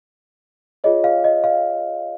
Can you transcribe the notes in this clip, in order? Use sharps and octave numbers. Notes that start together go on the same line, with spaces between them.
F4 G#4 C#5 D#5
F5
D#5
F5